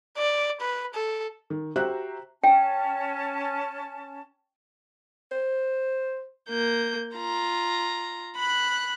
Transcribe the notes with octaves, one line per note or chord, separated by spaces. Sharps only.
D5
B4
A4
D#3
F#4 G4 C5 E5 A#5 F#6
C#4 G5 A5
C5
A#3 G6
F4 A#5
B5 F#6